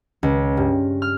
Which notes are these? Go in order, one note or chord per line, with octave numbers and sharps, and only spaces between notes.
C#2
G2
F6